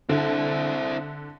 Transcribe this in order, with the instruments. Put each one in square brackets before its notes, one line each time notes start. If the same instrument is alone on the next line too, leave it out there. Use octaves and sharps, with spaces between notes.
[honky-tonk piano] D3 [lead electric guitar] C4 E4